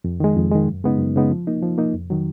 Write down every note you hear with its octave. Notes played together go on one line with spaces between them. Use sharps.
F2
D#3 G#3
F2
D#3 G#3
F#2
C#3 G#3 B3 D#4
F#2
C#3 G#3 B3 D#4
F3
A#3 D#4
F3
A#3 D#4
F2
D#3 F#3